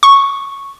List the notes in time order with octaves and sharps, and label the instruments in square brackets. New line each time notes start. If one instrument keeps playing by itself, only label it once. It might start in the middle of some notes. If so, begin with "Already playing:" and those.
[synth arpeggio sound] C#6